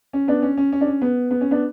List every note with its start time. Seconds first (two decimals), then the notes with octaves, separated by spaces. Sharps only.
0.13 C#4
0.28 B3 D4
0.42 C#4
0.57 C#4
0.72 C#4
0.81 D4
0.87 C#4
1.02 B3
1.31 B3
1.41 C#4
1.51 B3 D4